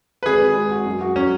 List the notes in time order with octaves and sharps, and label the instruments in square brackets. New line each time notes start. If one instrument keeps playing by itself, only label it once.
[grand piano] B4
[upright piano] G#1 [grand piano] G#4
[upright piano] G#1
G#3
F#4
F#2
F#4
[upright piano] F#3 [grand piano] C#4